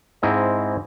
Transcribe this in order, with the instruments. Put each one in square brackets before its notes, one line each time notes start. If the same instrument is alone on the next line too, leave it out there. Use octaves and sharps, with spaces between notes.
[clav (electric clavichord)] G#2 C4 E4 D#5 A#5